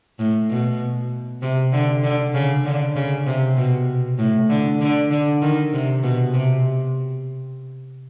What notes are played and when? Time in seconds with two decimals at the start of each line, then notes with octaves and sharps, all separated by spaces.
0.19 A2
0.50 B2
1.42 C3
1.73 D3
2.04 D3
2.34 C#3
2.65 D3
2.96 C#3
3.27 C3
3.57 B2
4.19 A2
4.49 D3
4.81 D3
5.11 D3
5.42 D#3
5.73 C3
6.03 B2
6.34 C3